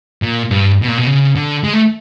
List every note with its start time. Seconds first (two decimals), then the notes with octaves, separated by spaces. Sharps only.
0.22 A#2
0.51 G2
0.82 B2
0.88 A#2
0.98 B2
1.07 C#3
1.36 D3
1.64 G#3
1.73 A3